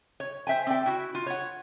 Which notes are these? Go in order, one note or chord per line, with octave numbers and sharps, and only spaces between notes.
C#5
C5 E5 G5 G#5
C4 D5 G5
E4 F#4
F4
C#5 F#5